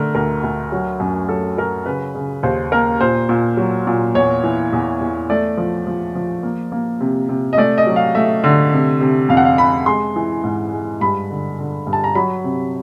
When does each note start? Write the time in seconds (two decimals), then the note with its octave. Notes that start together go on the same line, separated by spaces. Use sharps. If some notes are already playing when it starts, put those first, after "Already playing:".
Already playing: D3 A3 A#4
0.15 D2 A#4
0.43 D2
0.72 F#3
1.00 F#2
1.29 F#3 A4
1.58 F#3 A#4
1.86 C#3 B4
2.15 C#3
2.43 D#2 C5
2.72 A#3 A#4
3.01 A#2 C5
3.29 A#2
3.57 F#3
3.87 A#2
4.15 E2 C#5
4.44 E3
4.73 E2
5.01 E2
5.30 A3 D5
5.57 F3
5.87 F3
6.15 F3
6.43 A#3
6.72 A#3
7.01 C3
7.29 C3
7.53 D#5
7.58 A3 D5
7.78 D#5
7.87 F#3
7.96 F5
8.15 A3 E5
8.44 D3
8.73 C3
9.01 C3
9.29 F2 F5
9.37 F#5
9.45 F5
9.58 C3 B5
9.86 G#3 C6
10.16 E3
10.44 G#2
10.73 G#3
11.01 G2 B5
11.30 D3
11.58 D3
11.87 G2
11.93 A5
12.04 A#5
12.15 F#3 B5
12.44 C3